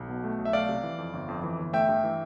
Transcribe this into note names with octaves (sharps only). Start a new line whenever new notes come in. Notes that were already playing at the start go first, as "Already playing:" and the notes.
Already playing: B1
B2
A3
B1
E5
A3 D5 F5
C3
E3
F2
G1
F2
E3
G1
A3 E5 G5
G2
E3